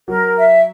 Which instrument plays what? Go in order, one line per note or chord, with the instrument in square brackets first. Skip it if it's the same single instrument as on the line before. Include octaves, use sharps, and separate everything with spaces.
[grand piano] F#3 [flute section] A#4
[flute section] E5